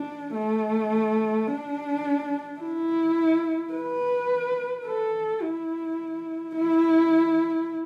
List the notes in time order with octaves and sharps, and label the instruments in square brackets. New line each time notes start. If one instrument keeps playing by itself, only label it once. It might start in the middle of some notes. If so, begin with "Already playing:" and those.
Already playing: [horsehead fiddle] D4
A3
D4
E4
B4
A4
E4
E4